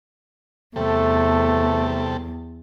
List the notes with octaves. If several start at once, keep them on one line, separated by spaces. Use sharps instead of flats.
E2 C3 G3 A3 A4